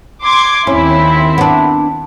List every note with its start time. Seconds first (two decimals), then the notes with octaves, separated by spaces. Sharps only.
0.24 C6 D6 G#6
0.67 D#2 C4 C#4 E4
1.38 B3 D4